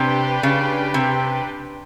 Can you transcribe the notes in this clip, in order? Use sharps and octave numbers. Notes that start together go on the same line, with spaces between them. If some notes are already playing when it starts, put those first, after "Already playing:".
Already playing: C3 D4 G4 B4
C#3
C3